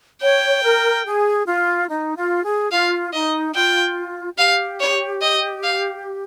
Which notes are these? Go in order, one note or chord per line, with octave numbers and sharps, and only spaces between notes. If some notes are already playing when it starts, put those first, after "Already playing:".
C#5 G5
A#4
G#4
F4
D#4
F4
G#4
F4 F5
D#4 D#5
F4 G5
G4 F5
C#5
D#5
F5